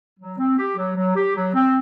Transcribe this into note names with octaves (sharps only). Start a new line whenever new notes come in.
F#3
C4
G4
F#3
F#3
G4
F#3
C4